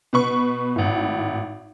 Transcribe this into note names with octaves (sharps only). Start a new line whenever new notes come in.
B2 B4 C#6
G#1 A2